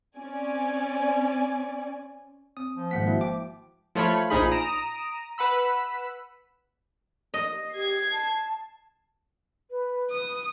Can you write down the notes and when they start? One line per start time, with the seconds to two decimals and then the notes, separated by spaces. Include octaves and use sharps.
0.16 C4 C#4 D5 G#5
2.57 C4 D#6
2.77 F3
2.91 G#1 G#3 A#3 F#5 B6
3.06 E4 F#4 E5
3.21 G5 D6
3.95 F3 A3 F4 C#5 B5 C#7
4.30 A#1 F3 D#4 G#4 B5
4.51 A#5 D#6 D7 E7
5.38 B4 F#5 B5 E6
7.34 D#5
7.74 G4 G#6 C7
8.11 A5
9.70 B4
10.11 D#6